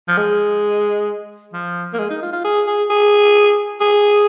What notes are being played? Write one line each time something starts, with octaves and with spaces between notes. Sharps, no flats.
F3
G#3
F3
A#3
G#3
D#4
F4
F4
G#4
G#4
G#4
G#4